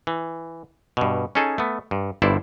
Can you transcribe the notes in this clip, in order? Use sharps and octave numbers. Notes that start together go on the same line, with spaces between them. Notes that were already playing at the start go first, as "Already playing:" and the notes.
E3
G2 B2
C#4 D#4 G#4 A4
A3 B3
G2
G1 G2 E4 C5 D5